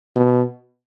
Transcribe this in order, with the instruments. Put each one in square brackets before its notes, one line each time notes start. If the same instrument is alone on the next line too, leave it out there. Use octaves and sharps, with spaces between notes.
[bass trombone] B2